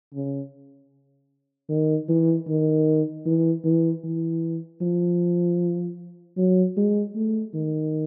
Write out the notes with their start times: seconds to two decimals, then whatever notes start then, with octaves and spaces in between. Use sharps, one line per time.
0.14 C#3
1.69 D#3
2.08 E3
2.48 D#3
3.26 E3
3.64 E3
4.04 E3
4.81 F3
6.37 F#3
6.77 G#3
7.15 A3
7.54 D#3